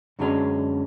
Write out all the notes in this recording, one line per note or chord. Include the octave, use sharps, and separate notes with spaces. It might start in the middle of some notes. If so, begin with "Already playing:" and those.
F#2 D3 F#3 G#3 C#4